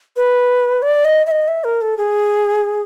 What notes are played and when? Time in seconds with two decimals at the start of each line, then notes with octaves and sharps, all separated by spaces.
0.16 B4
0.82 D5
1.05 D#5
1.27 E5
1.31 D#5
1.48 E5
1.64 A#4
1.81 A4
1.97 G#4